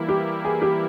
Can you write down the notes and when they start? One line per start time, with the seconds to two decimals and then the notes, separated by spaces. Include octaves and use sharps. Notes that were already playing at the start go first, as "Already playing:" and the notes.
Already playing: E3 G3 A#3 E4
0.09 G4
0.45 G#4
0.62 G4